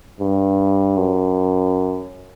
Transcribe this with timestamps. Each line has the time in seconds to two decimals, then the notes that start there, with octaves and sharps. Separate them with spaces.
0.20 G2
0.97 F#2